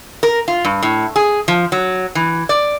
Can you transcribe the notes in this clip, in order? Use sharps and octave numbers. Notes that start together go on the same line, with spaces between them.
A#4
F4
G2
A2
G#4
F3
F#3
E3
D5